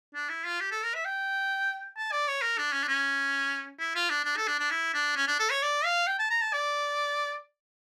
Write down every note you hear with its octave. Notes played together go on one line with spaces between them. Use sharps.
D4
E4
F4
G4
A4
A#4
E5
G5
A5
D5
C#5
A#4
D4
C#4
D4
C#4
E4
F4
D4
D4
A4
D4
D4
E4
D4
C#4
D4
A4
C#5
D5
F5
G5
A5
A#5
A5
D5